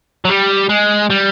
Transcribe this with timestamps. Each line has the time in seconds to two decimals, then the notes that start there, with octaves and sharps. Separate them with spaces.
0.25 F#3
0.29 G3
0.69 G#3
1.10 G3